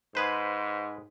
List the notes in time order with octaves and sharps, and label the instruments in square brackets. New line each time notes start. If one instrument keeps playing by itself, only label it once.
[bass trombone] G#2 [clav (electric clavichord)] G#4 B4 C5